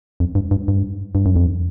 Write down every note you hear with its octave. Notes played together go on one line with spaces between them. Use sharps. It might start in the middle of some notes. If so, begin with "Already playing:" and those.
F2
G2
G2
G2
G2
F#2
F2